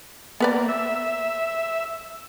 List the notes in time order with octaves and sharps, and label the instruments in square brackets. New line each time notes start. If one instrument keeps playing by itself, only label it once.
[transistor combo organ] A#3 [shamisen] B3 B4 D5
[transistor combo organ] E5